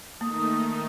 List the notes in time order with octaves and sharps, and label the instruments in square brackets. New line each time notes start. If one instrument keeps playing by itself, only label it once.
[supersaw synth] D#3 A3 D#4 [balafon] A#3 [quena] D#6